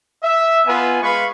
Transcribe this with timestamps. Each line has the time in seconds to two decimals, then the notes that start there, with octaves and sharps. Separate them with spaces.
0.23 E5
0.67 B3 F4 B4 G#5
1.03 G#3 B4 F5 B5 C#6